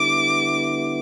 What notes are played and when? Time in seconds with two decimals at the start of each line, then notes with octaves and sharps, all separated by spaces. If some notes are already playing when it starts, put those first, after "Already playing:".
Already playing: D3 G3 B3 E4 D6